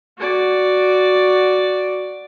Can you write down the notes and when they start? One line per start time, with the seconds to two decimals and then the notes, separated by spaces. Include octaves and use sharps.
0.18 F#4 D5